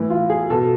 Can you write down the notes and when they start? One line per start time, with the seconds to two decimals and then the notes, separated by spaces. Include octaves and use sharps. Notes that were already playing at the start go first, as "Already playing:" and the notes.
Already playing: A2 E3
0.10 F4
0.30 G#4
0.50 B2 A4